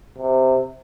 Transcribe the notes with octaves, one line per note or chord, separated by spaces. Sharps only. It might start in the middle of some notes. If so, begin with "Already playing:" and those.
C3